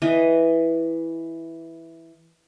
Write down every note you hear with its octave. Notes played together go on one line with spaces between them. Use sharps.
E3 D#5